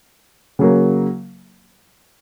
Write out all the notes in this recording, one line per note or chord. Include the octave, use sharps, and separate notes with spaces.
C#3 F#3 A#3